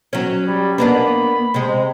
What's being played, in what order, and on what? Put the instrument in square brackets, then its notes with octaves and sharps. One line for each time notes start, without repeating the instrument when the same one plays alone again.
[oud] F#3 C#4
[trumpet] G3
[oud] A#3 B3 D4 [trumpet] B5
[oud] C3 G#3